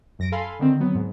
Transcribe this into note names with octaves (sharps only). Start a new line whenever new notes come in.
F#2 A#6 D7
A4 F5 G#5 B5 C6
D3 D#3 C4
F#3 B3
G#2